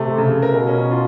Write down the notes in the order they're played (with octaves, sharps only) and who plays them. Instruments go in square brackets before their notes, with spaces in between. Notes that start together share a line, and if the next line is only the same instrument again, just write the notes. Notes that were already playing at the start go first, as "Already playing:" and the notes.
Already playing: [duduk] C3 [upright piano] A3
[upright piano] C#3
[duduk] B2 [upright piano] A#4
[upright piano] C#4
F4